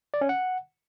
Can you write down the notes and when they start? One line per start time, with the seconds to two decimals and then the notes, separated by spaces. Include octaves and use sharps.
0.14 D5
0.21 C#4
0.29 F#5